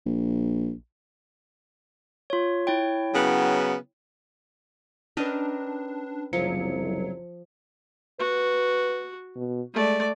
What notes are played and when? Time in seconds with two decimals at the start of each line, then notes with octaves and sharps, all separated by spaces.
0.06 A#1
2.30 F4 C#5
2.67 E4 C#5 G5
3.14 C#3 F#3 B3
5.17 C#4 D4 A#4 B4 D5 D#5
6.33 F#1 C2 F3 F#3 C#7
8.20 F#4 B4
9.36 B2
9.74 G#3 A3 D5